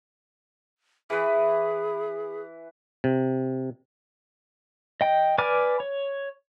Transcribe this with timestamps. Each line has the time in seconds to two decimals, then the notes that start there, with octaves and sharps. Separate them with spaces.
1.10 E3 G#4 B4
3.04 C3
5.01 D#5 G5
5.38 B4 D5 G#5 D6 F6
5.80 C#5